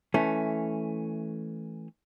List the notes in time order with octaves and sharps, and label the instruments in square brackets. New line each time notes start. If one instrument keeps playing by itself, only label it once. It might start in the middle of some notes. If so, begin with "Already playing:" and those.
[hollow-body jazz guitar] E3 A3 C#4